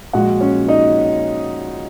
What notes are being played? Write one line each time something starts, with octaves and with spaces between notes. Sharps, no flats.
A#1 A#2 G#3 F#4 F#5
C#4 C#5
D#4 D#5